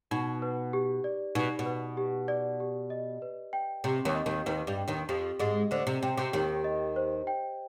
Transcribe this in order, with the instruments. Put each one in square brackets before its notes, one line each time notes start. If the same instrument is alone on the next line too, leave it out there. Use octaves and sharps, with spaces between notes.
[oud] B2 [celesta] D#4
[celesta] B4
G4
D5
[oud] B2 [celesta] D#4
[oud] B2
[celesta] B4
G4
D5
G4
D#5
B4
G5
[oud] C3 [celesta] G4
[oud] D#2 D#3
[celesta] D#5
[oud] D#2 D#3
[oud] D#2 D#3 [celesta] B4
[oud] G2 G3
[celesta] G5
[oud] D#2 D#3
[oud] F2 F3 [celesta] G4
[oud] G#2 G#3 [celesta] D#5
[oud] D2 D3 [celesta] C5
[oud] C3
[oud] C3 [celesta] G5
[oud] C3
[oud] D#2 D#3 [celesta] G4
[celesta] D#5
C5
G5